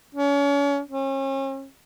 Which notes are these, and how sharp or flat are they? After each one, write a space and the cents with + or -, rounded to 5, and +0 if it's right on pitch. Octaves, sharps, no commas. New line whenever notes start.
C#4 +35
C#4 -40